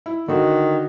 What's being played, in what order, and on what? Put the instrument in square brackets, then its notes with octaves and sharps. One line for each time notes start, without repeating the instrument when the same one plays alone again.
[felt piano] E4
[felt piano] D3 F#4 [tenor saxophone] D#3